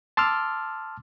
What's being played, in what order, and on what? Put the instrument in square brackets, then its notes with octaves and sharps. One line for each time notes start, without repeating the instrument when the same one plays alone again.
[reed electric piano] A5 C6 D6 E6 F6